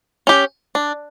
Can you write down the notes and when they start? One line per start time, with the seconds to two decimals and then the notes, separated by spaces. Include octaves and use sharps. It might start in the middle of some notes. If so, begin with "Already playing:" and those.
0.27 C#4 G4
0.75 D4